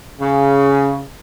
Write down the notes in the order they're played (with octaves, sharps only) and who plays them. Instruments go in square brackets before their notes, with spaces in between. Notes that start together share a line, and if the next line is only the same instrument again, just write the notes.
[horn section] C#3